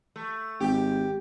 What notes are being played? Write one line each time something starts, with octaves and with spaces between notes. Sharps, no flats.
A3
G#1 G4